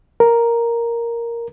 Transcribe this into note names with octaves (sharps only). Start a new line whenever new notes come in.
A#4